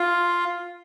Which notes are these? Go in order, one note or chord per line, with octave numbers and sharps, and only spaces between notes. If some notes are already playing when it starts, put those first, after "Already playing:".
Already playing: F4